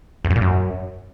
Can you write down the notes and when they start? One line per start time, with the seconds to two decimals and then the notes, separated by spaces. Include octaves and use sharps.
0.25 E2
0.30 F#2
0.36 A#2
0.41 F#2